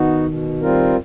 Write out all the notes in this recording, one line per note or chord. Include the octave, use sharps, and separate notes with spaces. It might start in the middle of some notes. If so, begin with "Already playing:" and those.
Already playing: D#3 B3 D#4 F#4
B2
G3 C4 F4 A#4